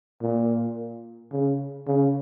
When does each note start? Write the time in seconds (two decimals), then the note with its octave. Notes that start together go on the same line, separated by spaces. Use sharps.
0.22 A#2
1.32 C#3
1.87 C#3